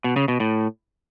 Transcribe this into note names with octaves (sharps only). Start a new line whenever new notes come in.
B2
C#3
B2
A2